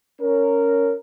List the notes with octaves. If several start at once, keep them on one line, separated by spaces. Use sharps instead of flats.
C#4 A#4